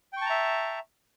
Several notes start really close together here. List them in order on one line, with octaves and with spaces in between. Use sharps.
G5 C#6 A5 A#5 E5